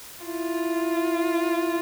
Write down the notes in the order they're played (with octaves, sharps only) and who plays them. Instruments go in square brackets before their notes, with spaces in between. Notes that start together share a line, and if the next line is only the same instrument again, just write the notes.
[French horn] E4 [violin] F4